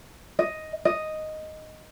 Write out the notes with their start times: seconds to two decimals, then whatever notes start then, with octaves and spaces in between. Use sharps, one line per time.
0.39 D#5
0.85 D#5